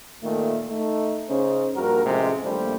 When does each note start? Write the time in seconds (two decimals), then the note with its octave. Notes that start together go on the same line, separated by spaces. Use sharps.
0.22 A#2 D#3 A3
0.70 A3 D#4
1.28 C#3 C#4 D#4 C5
1.75 A#1 G2 F#4 A#4
2.05 A1 C3 F3 G#3
2.43 A#1 D#2 G3 A3 C5